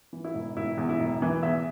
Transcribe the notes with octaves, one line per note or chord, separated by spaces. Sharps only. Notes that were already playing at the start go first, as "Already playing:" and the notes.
E3
E4
E1
E1 E4
E2
E4
E1
E3
E2 E5